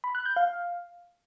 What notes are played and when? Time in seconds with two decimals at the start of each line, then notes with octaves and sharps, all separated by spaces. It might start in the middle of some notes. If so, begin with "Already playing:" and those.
0.04 B5
0.15 F#6
0.26 G6
0.36 F5